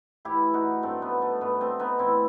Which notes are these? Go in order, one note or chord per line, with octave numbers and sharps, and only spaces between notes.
A2 E3 E4 G4
D#4 F#4
G2 F#3 A3 C4
B3
A3
G2 D#3 F#3 B3
A3 C4
B3 D#4
A2 E3 C4 E4